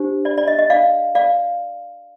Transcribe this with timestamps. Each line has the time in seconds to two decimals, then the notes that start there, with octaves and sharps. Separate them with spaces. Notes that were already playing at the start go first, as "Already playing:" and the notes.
Already playing: D4 G4 C5
0.25 D5
0.38 D5
0.47 D#5
0.59 D#5
0.70 D5 F5
1.15 D5 F5